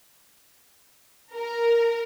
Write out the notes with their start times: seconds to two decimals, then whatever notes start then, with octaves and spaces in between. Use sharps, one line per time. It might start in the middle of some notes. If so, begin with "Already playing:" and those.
1.33 A#4